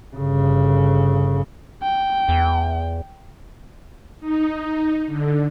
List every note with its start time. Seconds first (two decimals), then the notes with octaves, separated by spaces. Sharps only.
0.16 G1 C#3
1.83 G5
2.29 E2
4.20 D#4
5.06 D3